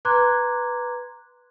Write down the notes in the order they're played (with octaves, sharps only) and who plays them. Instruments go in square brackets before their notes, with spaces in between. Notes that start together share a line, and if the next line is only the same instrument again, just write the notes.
[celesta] B4 A#5 C6 D6 F#6 G#6